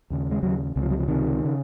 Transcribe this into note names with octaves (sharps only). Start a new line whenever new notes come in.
D#2 C#3
G#3
D#2 C#3 F#3
C#2 C3
F3
F#3
F3
C#2 C3 D#3
C#3